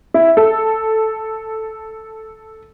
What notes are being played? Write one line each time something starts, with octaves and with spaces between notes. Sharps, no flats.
E4
A4